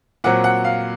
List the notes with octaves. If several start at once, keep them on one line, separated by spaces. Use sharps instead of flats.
A#2 F#3 C4 F#5
F#5
F5